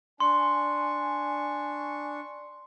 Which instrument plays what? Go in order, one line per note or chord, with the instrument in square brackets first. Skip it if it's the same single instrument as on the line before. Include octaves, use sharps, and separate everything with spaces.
[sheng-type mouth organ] D4 C#6 [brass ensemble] G#5 [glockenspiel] C6